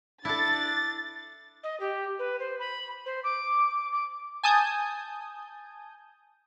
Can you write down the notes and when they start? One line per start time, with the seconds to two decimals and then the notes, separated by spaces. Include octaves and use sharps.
0.25 D4 E4 A4 A6
1.63 D#5
1.80 G4
2.19 B4
2.40 C5
2.60 B5
3.06 C5
3.24 D6
3.93 D6
4.43 G#5 A5 D#6 G6